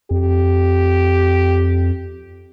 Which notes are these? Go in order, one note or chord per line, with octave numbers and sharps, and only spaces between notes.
F2 G4